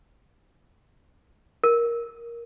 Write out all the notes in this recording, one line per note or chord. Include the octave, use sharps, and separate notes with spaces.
A#4